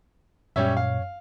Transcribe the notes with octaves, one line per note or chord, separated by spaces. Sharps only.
F#2 A#2 G3 C#4 C#5 E5
F5